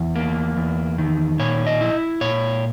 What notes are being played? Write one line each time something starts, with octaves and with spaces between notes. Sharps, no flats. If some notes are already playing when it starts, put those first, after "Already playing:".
Already playing: E2
A#3
E2
D#3
A#2 C#5
D#5
E4
A#2 C#5